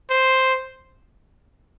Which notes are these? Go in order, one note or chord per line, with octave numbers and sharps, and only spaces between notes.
C5